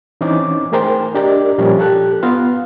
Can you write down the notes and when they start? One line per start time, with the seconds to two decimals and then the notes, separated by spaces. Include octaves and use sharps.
0.21 E3 C4 C#4 D#4 D6
0.72 A3 G#4 A#4 C5 G5
1.15 D4 G4 A#4 D5 D#5
1.58 A#2 F3 G3 C#4 A#4
1.79 G4 A4 F#6
2.23 B3 F4 F5